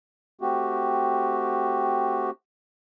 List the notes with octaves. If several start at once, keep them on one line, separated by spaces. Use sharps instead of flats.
A3 C4 F#4 G4